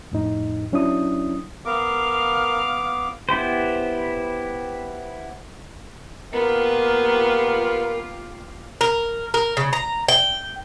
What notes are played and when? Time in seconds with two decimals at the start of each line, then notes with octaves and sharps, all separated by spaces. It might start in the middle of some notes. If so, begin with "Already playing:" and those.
0.11 F2 A2 D#4
0.72 F#3 C#4 D4 E4 D#6
1.65 B3 A#4 F5 D6
3.29 B3 E4 G4 C5
6.33 A#3 B3 F4 G4 A#4
8.81 A#4
9.34 A#4
9.57 C#3
9.73 A#5
10.08 G5